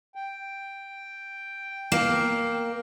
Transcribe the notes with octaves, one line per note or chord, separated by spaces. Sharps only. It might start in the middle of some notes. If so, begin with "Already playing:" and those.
G5
A#3